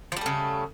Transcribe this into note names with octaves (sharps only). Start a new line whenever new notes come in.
C#3 F3 G3 A3